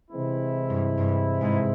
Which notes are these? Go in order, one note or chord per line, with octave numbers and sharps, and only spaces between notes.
C3 E3 G#3 C4 E4
G2
G2
G#2